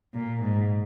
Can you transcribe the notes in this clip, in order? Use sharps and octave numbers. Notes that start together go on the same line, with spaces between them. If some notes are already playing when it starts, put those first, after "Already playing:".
A#2
G#2